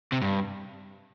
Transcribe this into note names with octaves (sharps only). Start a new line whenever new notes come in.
C3
G2